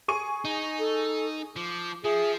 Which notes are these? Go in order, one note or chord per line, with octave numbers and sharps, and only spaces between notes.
G#4 C#6 D#7
D#4
A4
F3 D6
F3 G#4 E5